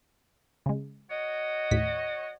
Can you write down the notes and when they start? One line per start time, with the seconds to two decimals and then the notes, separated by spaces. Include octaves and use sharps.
0.66 C#3 G#3
1.10 F#4 C#5 D#5
1.71 D#2 A2 B6